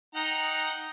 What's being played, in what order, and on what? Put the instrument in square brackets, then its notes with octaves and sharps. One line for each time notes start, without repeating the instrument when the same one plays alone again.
[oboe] D#4 [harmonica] F#5 G5 A#5